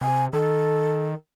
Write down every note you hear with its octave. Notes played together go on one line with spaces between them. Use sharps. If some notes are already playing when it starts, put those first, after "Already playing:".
C3 G#5
D#3 A4